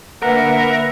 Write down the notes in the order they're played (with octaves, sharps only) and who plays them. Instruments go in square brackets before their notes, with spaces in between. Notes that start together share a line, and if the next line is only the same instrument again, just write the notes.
[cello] D3 A#3 [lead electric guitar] A#4 [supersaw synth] B4 E5 [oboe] F#5